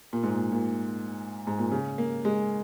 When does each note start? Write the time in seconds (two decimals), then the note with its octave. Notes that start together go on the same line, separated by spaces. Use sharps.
0.13 A#2
0.23 G#2
0.34 A#2
0.52 A#2
1.47 G#2
1.59 A#2
1.72 C#3
1.98 A#3
2.25 G#3